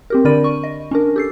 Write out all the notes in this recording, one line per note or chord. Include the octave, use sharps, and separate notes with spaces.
C4 G4 A#4
D3 D4 A#4 D5 B5 D#7
C#6
D#5
C#4 D4 A#4
G4 A4 C7